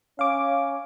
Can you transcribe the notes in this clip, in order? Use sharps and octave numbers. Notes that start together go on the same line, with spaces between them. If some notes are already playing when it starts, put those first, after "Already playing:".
C#4 F5 D6